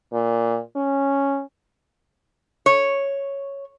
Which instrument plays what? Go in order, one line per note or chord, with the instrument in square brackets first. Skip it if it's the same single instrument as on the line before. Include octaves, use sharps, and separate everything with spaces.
[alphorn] A#2
C#4
[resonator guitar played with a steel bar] C#5